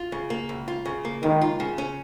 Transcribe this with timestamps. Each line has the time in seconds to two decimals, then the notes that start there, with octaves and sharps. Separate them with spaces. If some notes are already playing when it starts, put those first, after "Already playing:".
Already playing: F4
0.12 C#3
0.30 A#3
0.49 C#2
0.68 F4
0.86 C#3
1.05 A#3
1.23 C#2 D#3
1.42 F4
1.60 C#3
1.78 C#4